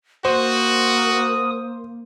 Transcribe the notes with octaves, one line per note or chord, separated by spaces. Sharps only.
A#3 F#4 C5 D#6